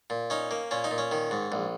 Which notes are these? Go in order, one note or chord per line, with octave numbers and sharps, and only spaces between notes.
A#2
C#4 D#4
A#3
A#2 C#4
D#4
A#2
C#4
D#3
G#2
A#1